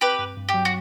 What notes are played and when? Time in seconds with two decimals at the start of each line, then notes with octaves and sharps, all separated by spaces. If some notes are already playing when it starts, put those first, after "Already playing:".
0.01 C4 G4 B4
0.19 G2
0.37 G2
0.49 G4
0.54 F#3
0.65 F#4